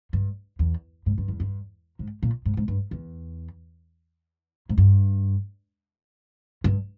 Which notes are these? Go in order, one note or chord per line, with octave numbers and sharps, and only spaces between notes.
G2
E2
G#2
G2
E2
G2
G#2
A#2
G#2
G#2
G2
E2
G#2
G2
G2